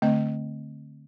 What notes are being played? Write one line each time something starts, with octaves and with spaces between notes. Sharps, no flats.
D3 A3 C4 D#5